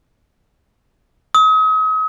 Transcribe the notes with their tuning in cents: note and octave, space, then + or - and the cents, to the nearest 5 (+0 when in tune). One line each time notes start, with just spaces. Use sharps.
D#6 +40